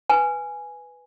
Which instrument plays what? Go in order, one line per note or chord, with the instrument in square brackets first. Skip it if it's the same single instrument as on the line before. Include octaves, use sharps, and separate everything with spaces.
[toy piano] B4 G#5